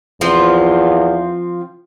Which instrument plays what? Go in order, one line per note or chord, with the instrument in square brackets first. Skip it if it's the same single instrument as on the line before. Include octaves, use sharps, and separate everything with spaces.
[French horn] E2 [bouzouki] F3 C4 F4